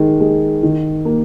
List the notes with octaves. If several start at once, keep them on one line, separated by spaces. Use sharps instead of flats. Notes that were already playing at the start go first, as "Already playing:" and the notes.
Already playing: D#3 G#3
G#3
D#3
A#3